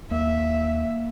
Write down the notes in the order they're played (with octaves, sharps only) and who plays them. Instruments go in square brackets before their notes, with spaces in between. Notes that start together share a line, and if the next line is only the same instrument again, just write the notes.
[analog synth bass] D#2 [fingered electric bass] A#3 [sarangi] E5